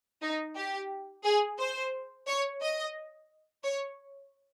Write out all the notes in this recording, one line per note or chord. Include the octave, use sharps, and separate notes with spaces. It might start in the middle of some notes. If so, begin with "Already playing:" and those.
D#4
G4
G#4
C5
C#5
D#5
C#5